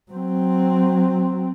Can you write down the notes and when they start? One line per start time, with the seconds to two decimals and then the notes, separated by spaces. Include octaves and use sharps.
0.12 F#3 C4